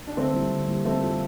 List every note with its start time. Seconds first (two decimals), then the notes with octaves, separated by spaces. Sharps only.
0.07 D4
0.17 D3 A3 C4
0.34 G3 A#3 E4
0.51 D3
0.68 G3 A#3 E4
0.85 F3 A3 C4
1.02 A#3 F4 A4